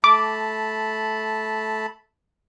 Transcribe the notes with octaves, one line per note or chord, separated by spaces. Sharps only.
A3 A5 B5 D6